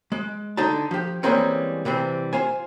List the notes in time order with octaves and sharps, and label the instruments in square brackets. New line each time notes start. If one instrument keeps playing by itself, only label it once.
[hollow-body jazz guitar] G#3
D3 D#4 A5
F3 G4
E3 G3 G#3 A#3 C4 C#4
C3 E3 G3 C4
F4 C5 G#5